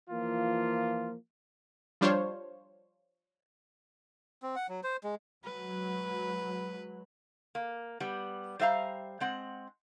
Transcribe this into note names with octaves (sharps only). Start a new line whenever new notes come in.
E3 F3 A#3 F4
F3 G3 D4 F4 C5 C#5
C4
F#5
F#3
C5
G#3
F#3 G#3 B4
A#3
G3 B3
G3 C5 E5 F5 A#5
G#3 C4 F#5